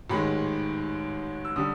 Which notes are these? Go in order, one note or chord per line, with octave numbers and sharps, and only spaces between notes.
A1 G#2 D#3 G#3 B5
E6
D3 G3 D#6